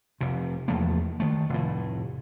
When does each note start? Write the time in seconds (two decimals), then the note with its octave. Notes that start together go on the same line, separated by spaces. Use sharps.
0.21 F1 C3
0.68 E2 F3 A3 A#3
1.20 D#3 A3
1.49 F1 A2